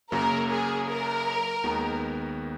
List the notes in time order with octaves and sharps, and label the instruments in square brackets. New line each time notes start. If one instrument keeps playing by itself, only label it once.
[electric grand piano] F#2 C#3 F#3 A#3 C#4 [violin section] A#4
[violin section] G#4
A#4
[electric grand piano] D#2 D#3 G#3 B3 F#4